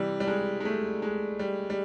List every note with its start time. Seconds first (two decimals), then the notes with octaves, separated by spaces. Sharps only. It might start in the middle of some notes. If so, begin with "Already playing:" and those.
Already playing: C3 E3 G3
0.20 G3
0.27 G#3
0.60 G#3
0.65 A3
1.02 G#3
1.39 G3
1.70 G3